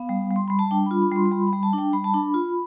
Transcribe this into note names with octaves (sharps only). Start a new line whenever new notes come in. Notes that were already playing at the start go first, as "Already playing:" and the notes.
Already playing: B3 F5
G3
G3
C6
G3 B5
A5
D4 G5
F4 B5
B5
G3 C6
C6
G3 B5
B5
G3
A5
D4
G5
G3 B5
A5
D4 B5
F4